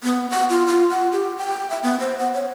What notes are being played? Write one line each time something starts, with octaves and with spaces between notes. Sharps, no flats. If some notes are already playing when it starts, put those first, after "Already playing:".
B3
F#5
F4
F4
F#5
G4
G5
E5
B3
C5
F#5
C#5